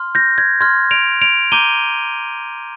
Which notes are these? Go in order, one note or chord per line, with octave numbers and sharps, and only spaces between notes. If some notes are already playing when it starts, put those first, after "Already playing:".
Already playing: C6 F6
G6 A#6
G#6
C6 F6 G#6
D7 F7
D7 F7
A#5 D6 G6 D#7 G7